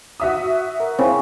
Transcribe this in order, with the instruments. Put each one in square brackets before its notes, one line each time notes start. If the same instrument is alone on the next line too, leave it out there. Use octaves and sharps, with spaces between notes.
[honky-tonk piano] F#4 E5 D#6
[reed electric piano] A#4
[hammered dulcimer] C#3 [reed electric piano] C4 E4